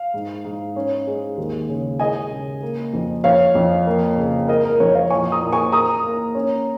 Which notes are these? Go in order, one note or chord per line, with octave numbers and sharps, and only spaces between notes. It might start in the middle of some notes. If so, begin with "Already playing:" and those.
Already playing: F5
G#2
G#2
C#4
G#3
D#2
C#3
G#3 D#5 G#5
C#3
A#3
F2
F2 C#5 F5
F2
A#3
C#3
G#3 A#4 D#5
A#4
F2 C#5
C#5 F5
A#2 G#5 C#6
A#5 D#6
A#2
G#5 C#6
A#3 A#5 D#6
A#3
C#4